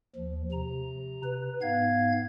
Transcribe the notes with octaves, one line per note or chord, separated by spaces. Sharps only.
D#2 F3
C3 A#5
B4
G#2 B3 F5 G#6